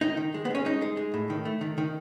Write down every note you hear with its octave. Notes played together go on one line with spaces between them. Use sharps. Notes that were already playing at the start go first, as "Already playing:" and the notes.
D#3 D#4
D#3
G#3
B3
G#3 C#4
G#3 D#4
G#3
G#3
A2
D#3
A3
D#3
D#3